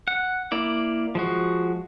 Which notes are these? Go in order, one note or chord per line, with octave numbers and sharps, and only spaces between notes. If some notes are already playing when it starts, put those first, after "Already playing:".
F#5
A#3 E4 D5
F3 G#3 F#4